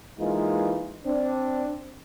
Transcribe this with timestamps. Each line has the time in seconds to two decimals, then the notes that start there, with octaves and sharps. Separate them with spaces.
0.19 E3 G#3 A#3 D#4 F4
1.05 C4 D4